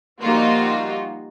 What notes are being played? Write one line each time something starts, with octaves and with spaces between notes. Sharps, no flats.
F3 G3 A#3 D#4 F4 F#4